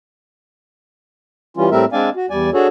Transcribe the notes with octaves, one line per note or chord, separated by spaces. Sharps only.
E3 G3 C#4 F4
A2 G3 A3 C4 A#4 E5
G#3 C4 D4 D5 F5 G#5
F#4
E2 G3 D5 G#5
D4 F#4 G#4 A4 C#5